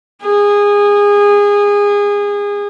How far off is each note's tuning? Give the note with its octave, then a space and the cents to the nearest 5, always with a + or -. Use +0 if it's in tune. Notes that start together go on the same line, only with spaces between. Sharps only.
G#4 -25